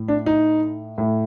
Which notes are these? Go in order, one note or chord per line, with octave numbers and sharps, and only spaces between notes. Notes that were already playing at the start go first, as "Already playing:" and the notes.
Already playing: A2
D4
D#4
A2